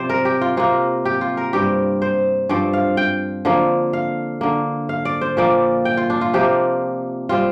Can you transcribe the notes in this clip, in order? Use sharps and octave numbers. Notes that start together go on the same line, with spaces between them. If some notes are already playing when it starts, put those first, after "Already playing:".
Already playing: C3 F3 C4 C5 D5
A#4
G4
F4
C3 A#3 F4
G4
F4
A#4
G2 G3 C4 G4
C5
G2 F3 C4 D5
F5
G5
D3 F3 A#3
F5
D3 A#3
F5
D5
C5
A#2 F3 A#3 D5
G5
F4
D4
F4
C3 F3 A#3 G4
G3 C4 F4